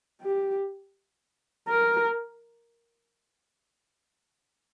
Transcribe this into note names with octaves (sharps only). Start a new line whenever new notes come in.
G4
A#4